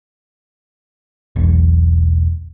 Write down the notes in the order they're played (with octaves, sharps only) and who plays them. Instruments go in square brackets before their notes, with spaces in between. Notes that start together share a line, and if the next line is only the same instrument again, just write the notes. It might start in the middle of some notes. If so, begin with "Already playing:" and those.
[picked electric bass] E1 B1